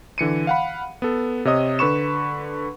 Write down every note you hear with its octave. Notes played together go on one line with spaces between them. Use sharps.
D3 E3 C#7 D#7
F5 F#5 B5
B3 A4
C3 C#5 D#5 D#6
D3 B4 B5 C#6 E7